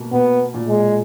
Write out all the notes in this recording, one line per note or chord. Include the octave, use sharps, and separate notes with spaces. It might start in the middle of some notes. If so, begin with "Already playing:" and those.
Already playing: B2 A#3
B2 B3
A#2
G#3